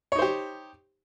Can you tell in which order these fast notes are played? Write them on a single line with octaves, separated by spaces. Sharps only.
C#5 D#4 C5 G4